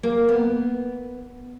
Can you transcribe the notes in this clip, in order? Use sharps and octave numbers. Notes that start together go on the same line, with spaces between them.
A#3
B3